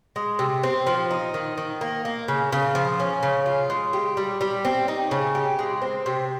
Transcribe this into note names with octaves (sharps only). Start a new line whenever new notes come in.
G#3
C3
C4
F3
D#4
D#3
D#3
A#3
A#3
C#3
C#3
F3
C#4
C#3
F4
G#3
G4
G3
G3
C4
D#4
C#3
G4
G#3
C4
C3